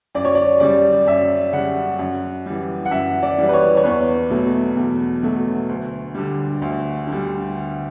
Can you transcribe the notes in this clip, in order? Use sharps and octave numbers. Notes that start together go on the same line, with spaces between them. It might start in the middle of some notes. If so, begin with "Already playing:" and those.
F#2 D5
C#5
D5
C#3 G3 D5
F#2 E5
C#3 G3 F#5
F#2
E3 G3
F#5
F#2 E5
D5
E3 G3
B4
C#5
C#5
E2 B4
B2 F#3 A3
E2
B2 F#3 A3
D2
D3 G3
D2
D3 G3